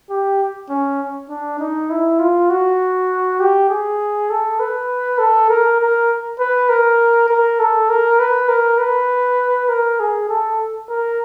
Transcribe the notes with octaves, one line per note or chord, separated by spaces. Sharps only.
G4
C#4
D4
D#4
E4
F4
F#4
G4
G#4
A4
B4
A4
A#4
A#4
B4
A#4
A#4
A4
A#4
B4
A#4
B4
A#4
G#4
A4
A#4